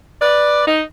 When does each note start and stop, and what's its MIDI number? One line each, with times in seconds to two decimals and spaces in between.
0.22 0.66 71
0.22 0.66 74
0.68 0.82 63